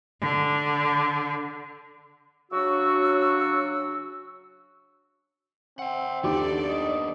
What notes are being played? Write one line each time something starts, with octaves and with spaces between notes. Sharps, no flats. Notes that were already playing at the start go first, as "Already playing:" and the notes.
D3
C#3 F#3 D4 F#4 C#6 E6
C4 E5 F#5
D#2 B3 D4 G4 A4 D5 D6
D#5